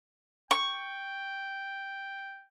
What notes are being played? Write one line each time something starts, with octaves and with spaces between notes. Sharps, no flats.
G5 C#6